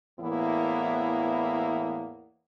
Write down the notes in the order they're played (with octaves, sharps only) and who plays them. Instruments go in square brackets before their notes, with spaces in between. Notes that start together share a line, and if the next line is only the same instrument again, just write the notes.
[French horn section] E2 A2 E3 A#3 B3 E4